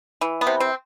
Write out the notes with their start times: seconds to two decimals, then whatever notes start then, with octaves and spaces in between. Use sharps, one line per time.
0.21 E3
0.41 B3
0.47 C3
0.60 C4